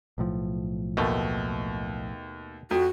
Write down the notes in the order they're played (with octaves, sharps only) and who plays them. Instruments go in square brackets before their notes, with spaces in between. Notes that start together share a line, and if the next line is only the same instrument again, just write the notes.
[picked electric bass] B1 A2 F3
[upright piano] D#2 [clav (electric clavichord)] B2 A3
[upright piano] F2 [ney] F#4